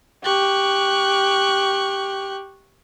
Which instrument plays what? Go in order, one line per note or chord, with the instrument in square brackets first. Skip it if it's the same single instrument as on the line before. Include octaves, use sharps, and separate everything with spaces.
[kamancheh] G4 [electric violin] C#6 F#6